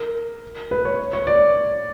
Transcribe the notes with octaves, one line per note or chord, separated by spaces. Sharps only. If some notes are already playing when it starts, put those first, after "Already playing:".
Already playing: A#4
B4
C#5
C#5
D5